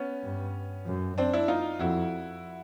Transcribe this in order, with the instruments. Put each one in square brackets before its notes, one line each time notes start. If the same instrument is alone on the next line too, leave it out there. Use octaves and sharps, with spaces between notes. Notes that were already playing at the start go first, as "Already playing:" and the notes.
Already playing: [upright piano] B3 C#4
[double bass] G2
F#2
[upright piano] C4 D4
D4 E4
D#4 F4
[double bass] F2 [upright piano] E4 F#4